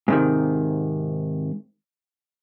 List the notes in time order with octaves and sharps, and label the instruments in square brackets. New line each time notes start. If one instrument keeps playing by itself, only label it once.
[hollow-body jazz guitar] G#2 C3 D#3